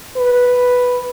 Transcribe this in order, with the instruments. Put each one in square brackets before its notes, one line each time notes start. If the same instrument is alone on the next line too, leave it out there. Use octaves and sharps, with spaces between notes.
[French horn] B4